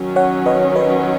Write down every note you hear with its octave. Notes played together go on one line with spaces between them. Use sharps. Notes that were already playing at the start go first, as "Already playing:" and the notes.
Already playing: D#3 F#3 C#4
C#5 F#5
B4 D#5
B4 D#5